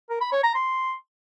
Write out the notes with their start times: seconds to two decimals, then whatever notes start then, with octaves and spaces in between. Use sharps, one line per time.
0.10 A#4
0.21 B5
0.32 C#5
0.43 A#5
0.54 C6